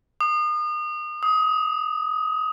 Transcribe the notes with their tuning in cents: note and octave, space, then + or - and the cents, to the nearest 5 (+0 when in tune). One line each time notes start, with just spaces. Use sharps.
D#6 -35
D#6 +25